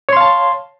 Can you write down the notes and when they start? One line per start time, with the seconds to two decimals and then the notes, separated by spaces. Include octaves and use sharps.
0.09 C#5
0.13 C6
0.17 F5
0.21 A5